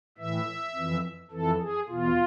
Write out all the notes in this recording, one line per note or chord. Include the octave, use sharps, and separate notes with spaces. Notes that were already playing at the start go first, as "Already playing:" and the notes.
A2 E3 E5
F2 E3
F2 E3 A4
G#4
E2 B2 F4